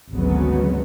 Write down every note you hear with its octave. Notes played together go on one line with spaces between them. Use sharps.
G#1 D2 C#3 F#3 B3